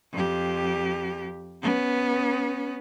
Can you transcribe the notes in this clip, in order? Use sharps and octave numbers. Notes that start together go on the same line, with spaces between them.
F2 G4
B3 C#4